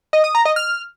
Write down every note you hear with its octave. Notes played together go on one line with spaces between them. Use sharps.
D#5
D#6
A#5
D#5
F6